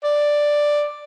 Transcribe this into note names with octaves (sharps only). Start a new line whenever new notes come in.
D5